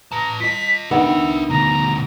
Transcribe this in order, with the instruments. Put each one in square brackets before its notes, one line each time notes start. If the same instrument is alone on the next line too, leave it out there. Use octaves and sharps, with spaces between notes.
[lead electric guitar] B4 A5 [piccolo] A#5
[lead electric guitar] F4 D#5 [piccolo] B6
[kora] D#3 B3 [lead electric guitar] D4 E5 [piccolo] E6
[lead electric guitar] D2 B2 [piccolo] A#5